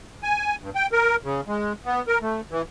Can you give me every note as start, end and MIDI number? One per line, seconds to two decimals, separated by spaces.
0.23 0.56 80
0.61 0.70 43
0.75 0.87 79
0.92 1.16 70
1.24 1.41 49
1.48 1.73 56
1.86 2.02 59
2.08 2.19 70
2.22 2.41 57
2.51 2.62 52